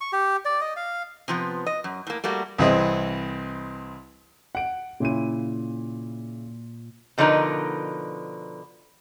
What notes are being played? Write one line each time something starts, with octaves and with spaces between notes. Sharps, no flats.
C#6
G4
D5
D#5
F5
C3 F3 B3
D#5
F#2
A2 A#3
G3 A3 A#3 F#4
C2 E3 C4 G#4 D#5
F#5 D7
A#2 C#3 E4 D#7
B2 D3 F3 D#4 A#4 B4